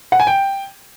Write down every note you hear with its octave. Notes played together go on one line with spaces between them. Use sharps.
F#5
G#5
G5